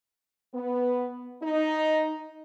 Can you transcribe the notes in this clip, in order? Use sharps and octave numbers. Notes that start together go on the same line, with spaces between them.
B3
D#4